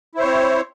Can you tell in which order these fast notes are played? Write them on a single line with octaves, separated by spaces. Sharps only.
E4 C5 C#5 C4